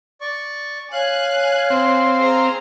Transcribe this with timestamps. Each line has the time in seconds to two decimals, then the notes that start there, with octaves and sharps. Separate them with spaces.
0.21 D5 C#6
0.93 C#5 F5 G#5 F#6
1.70 C4
2.20 G#4 C5 A#5